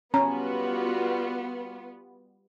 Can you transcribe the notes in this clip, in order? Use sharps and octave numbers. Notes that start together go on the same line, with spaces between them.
G3 B3 C#4 F4 F#4 A#5